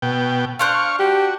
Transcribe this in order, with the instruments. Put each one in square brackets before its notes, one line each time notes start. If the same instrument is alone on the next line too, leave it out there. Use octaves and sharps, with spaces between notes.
[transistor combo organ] B2 G5
[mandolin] D4 C5 F#6 [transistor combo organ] F5 C#6
[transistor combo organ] F#4 [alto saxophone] G4